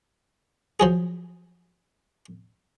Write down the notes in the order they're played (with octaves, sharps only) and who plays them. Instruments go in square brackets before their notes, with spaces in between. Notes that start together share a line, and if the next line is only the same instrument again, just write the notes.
[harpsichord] F3 F#3 G#4